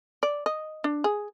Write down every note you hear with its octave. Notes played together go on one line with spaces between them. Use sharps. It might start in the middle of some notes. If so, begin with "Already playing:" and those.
D5
D#5
D4
G#4